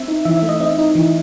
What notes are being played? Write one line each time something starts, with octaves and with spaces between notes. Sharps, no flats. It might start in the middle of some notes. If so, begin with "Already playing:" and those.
Already playing: C4 E5
D#4
E3 E5
E5
A3
D#5
C4 D#5
D#4
E3